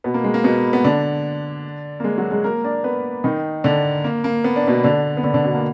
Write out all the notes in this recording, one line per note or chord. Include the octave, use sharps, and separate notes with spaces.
B2 B3
A#3
G#3
A#3
B2 B3
B3
D3 D4
A#3
G#3
F#3 F#4
G#3 G#4
A#3 A#4
D4 D5
B3 B4
D#3 D#4
D3 D4
A#3
A#3
B3
D4
B2 B3
D3 D4
B3
D3 D4
D3 D4
B2 B3
A#3